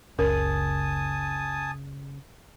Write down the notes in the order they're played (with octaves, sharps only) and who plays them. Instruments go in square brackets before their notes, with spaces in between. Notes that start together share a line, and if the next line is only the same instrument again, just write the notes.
[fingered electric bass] F#1 C#2 [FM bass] C#3 [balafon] A#4 [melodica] G#5 A5 D#6